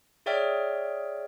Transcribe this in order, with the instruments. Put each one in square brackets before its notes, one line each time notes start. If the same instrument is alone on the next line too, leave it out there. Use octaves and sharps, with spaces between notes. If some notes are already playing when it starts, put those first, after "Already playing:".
[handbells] G#4 C#5 D5 E5 G5 F6